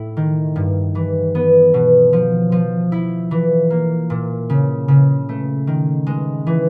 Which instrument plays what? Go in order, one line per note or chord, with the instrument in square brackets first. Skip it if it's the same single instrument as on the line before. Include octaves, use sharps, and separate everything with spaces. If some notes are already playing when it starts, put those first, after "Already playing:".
Already playing: [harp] A2 E4
D#3
G2
E3
B3
B2
F3
F3
E4
E3
A#3
A#2
C#3
C#3
A3
D#3
G#3
E3